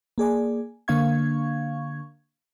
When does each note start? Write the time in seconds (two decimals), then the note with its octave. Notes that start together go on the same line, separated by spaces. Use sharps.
0.18 A#3 G#4 D5 G#5
0.88 D3 A#3 D4 F5 C#6 G#6